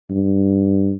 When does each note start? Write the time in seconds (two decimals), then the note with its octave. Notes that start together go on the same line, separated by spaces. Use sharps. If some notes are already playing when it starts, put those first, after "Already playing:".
0.10 G2